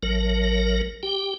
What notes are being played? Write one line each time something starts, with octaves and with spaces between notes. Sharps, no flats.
A1 F#3 A#4
G4 G5